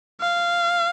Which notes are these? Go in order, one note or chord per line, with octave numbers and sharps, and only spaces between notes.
F5